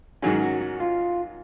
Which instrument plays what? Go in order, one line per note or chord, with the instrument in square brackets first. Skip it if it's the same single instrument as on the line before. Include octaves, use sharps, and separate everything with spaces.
[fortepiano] G#2 D#3 F#3 C#4 [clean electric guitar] G#4
[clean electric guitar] F#4
F#4
F4